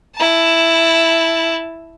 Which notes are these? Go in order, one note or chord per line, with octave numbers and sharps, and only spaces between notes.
E4 A5